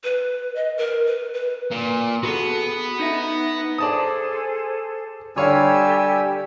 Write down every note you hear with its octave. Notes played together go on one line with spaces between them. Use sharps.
B4
D#5
A#4
B4
B4
A#2
B3 F#4 G#4 A4
D#4 D#5 E5
G#4 A4 C5 D5 A5 D#6
D3 G3 G4 A4 C#5 F5 G#5 E6